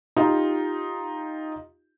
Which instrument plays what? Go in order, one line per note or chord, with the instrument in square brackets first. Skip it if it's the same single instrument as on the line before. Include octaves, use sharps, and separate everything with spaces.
[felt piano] D#4 F4 G4